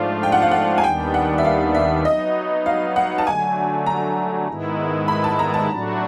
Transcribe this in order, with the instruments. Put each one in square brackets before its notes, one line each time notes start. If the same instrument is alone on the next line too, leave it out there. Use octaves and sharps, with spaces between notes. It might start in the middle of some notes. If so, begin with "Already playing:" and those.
Already playing: [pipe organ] G#2 F3 A3 D4 F4 [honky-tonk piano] F5
[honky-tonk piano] G5
F#5
F5
F#5
G#5
[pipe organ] D#2 D#3 G3 B3 D4 [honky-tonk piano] G5
[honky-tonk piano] F#5
E5
F5
E5
[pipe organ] F#3 B3 D#4 [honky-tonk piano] D#5
[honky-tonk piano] F5
F#5
A5
[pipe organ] D3 F#3 A3 [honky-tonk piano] G#5
[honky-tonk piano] A#5
[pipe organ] G#2 D#3 G#3 B3 E4
[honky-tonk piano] B5
A5
A#5
A5
[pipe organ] A2 F#3 A3 D4 F#4